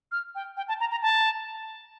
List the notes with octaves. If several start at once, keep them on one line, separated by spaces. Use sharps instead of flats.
F6
G5
G5
A5
A#5
A#5
A5